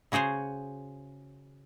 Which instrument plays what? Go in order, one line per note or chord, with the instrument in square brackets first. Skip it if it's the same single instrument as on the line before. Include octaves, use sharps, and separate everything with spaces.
[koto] C#3 F#4 G#4 C5 C#5